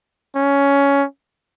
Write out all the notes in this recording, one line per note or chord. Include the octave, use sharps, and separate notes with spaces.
C#4